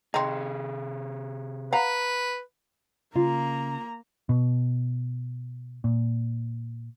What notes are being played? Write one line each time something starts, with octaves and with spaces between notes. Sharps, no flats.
C3 C4 D#4 G#4
B4 F5 F#5 A#5
C#3 A#3 F4 A#5
B2
A#2